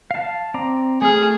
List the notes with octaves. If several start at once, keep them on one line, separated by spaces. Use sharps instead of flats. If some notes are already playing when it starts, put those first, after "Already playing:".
F5 A5
C4 D5 A#5
A3 G#4 F6